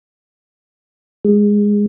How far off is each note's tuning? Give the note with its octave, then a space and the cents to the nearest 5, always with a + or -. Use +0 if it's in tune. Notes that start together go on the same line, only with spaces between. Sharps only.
G#3 -10